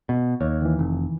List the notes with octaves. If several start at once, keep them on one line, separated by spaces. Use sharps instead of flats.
B2
D#2 C#5
D#3 E3
F1